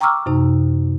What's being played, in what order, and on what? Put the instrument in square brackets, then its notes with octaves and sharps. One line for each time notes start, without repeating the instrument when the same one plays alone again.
[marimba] G5 A#5 C#6 D6 E6 F6
F#2 C3 D#4